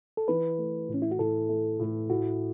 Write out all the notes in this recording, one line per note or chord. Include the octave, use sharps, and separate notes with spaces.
A4
E3 B4
A3
A2
C#4
E4
F#4
A2 A4
A3
A2
A2 F#4